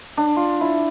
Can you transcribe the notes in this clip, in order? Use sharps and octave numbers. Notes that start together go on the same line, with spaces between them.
D4
F4
E4